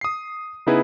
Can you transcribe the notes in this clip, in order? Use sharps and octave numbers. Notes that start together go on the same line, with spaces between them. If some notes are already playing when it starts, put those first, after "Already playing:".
D#6 C7
C#3 B3 D#4 E4 G#4 B4